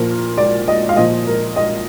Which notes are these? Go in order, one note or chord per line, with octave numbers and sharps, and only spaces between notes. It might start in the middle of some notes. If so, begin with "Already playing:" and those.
Already playing: A#2 F3 A#4
D5
D#5
F5
A#2 F3 D#5
A#4
D#5